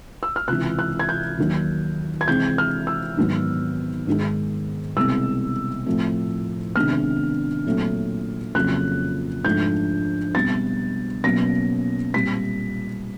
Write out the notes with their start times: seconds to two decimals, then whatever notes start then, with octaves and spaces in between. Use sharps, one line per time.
0.23 E6
0.36 F6
0.48 C#2 C3 E3 F#6
0.79 F#6
0.99 G#6
1.09 G6
1.38 D#2 D#3 F#3
2.21 G#6
2.28 C3 E3 G#3 C4 G6
2.58 F6
2.87 E6
3.17 G#2 D#3 F#3 B3
4.07 G#2 D#3 G#3
4.96 C2 B2 G#3 C4 E6
5.86 A2 F3 A3 C4
6.76 C3 D#3 G#3 B3 D4 F6
7.66 A#2 F#3 A3 C4
8.55 F2 C#3 F#3 A#3 F#6
9.45 G#2 F3 A3 D4 G6
10.35 B2 G3 C4 A6
11.24 B2 F#3 A#3 C#4 A#6
12.14 A#2 G3 C4 B6